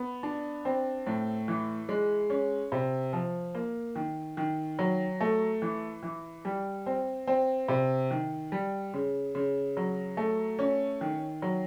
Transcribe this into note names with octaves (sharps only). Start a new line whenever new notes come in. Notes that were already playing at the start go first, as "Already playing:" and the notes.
Already playing: B3
D4
C4
A2
E3
G#3
C#4
C3
F3
A#3
D#3
D#3
F#3
A3
E3
E3
G3
C4
C4
C3
D#3
G3
C#3
C#3
F#3
A3
C#4
D#3
F#3